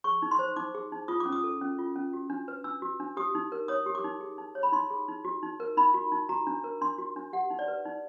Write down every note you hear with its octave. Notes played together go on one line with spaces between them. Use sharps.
G#4 C#6
D#4
C6
C5
D#4 D6
G#4
D#4
F4 D#6
D6
C#4
D#6
A4
C#4
F4
C#4
F#4
D4
B4
D4 E6
F#4
D4
G4 D#6
D#4
A#4
C#5 D#6
G4
D6
D#4
G#4
D#4
C#5
B5
D#4 C6
G#4
D#4
F#4
D#4
A#4
D#4 B5
F#4
D#4
F#4 A#5
D4
A#4
D4 C6
F#4
D4
G4 F#5
D#4
D5
B4
D#4